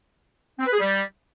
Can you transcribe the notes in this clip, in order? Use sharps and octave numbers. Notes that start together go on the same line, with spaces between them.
C4
B4
G#4
G3